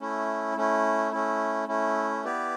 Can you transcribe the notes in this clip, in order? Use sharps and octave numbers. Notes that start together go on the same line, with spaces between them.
A3 C#4 E4
A3 C#4 E4
A3 C#4 E4
A3 C#4 E4
B3 E4 G4 B4 D5